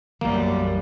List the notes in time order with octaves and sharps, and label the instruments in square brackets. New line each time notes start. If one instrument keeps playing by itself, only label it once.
[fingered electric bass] B1 E3 [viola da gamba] F#2 G3 [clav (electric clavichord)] A#3